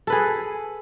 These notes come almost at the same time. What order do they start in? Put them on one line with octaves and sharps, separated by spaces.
A4 B4 G#4